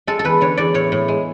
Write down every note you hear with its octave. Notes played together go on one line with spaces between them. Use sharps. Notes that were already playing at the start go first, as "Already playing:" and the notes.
G#3 A4
A4
E2 B4
D3 C#5
E2 D5
A2 C#5
A2
G#3